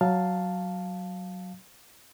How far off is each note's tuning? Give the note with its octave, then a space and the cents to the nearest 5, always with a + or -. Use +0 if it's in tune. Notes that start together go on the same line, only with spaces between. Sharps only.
F#3 +0 F5 +0 A5 +0